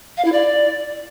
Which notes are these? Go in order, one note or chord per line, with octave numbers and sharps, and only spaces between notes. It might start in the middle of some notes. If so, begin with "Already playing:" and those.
F5
E4
D5